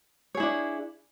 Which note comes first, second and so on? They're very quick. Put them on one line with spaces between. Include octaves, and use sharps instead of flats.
C#5 G#4 E4 D4